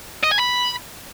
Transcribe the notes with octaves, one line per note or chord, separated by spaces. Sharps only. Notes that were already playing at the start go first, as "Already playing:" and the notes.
D#5
G#5
B5